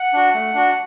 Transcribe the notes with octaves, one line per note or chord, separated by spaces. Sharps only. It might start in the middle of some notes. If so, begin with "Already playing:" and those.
Already playing: F#5
D4 F#4
A3
D4 F#4